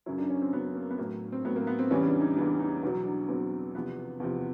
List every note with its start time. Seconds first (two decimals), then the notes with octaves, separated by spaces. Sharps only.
0.06 F#2 C#3 F#3 E4
0.18 D4
0.30 C#4
0.42 C4
0.53 F#2 C#3 F#3 B3
0.75 A#3
0.91 B3
0.98 A2 F#3 A#3
1.32 C4
1.45 A2 F#3 B3
1.56 A#3
1.67 B3
1.79 C4
1.91 E2 C#3 E3 G3 C#4
2.06 D4
2.20 D#4
2.36 E2 C#3 E3 G3 D4
2.59 D#4
2.82 E2 B2 F#3 D#4
3.05 D4
3.28 E2 B2 F#3 C4
3.75 E2 C3 F3 B3
4.20 E2 C3 F3